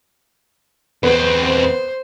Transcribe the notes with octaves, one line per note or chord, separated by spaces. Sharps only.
E2 B3 C4
C5